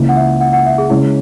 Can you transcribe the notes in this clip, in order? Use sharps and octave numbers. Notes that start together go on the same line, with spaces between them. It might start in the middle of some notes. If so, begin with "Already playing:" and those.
Already playing: C#2 C#3 E3 A#3
F#5
E5
F#5
F#5
E5
G#4
C#3 G#3 C#4 E4